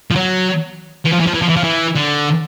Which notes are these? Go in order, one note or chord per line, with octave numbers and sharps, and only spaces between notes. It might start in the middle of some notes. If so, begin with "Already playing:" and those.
F3
F#3
E3
F3
E3
F3
E3
F3
E3
F3
E3
D3